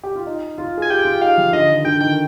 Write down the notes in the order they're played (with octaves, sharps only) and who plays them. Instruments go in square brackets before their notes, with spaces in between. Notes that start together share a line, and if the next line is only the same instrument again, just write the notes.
[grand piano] G4
F4
D#4
F4
[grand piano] G#4 [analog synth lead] G#5
[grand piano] G4 [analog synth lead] G5
[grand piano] F4
[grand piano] D#4 [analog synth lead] F5
[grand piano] F3
[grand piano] D3 [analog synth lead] D#5
[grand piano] D#3
[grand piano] D3 [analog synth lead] G5
[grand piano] D#3 [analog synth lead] G5